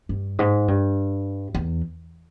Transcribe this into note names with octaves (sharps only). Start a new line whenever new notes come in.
G2
G#2
G2
E2